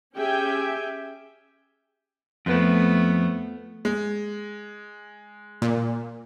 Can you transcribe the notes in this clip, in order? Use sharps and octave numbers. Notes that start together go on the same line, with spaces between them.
C#4 G4 G#4 E5 G5 G#5
F2 F3 A3 B3
G#3
A#2